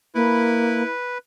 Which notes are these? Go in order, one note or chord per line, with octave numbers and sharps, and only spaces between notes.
A#3 E4 B4